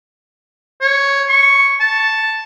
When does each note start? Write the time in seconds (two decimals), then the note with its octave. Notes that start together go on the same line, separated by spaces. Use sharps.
0.81 C#5
1.29 C#6
1.80 A5